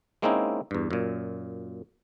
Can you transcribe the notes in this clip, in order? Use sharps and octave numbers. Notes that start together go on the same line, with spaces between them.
G#3 A#3 C4 C#4 D#4 E4
E2 G2
F#2 A#2